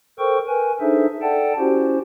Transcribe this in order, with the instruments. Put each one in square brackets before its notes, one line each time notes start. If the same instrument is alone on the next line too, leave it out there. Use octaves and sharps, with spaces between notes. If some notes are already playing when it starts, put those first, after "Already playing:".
[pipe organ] A4 A#4 C5 G5 C#6
A#4 B4 G#5
D4 D#4 G#4 A4 C5 E5
A4 D5 F#5 G5 A5
C#4 E4 F#4 G4 C5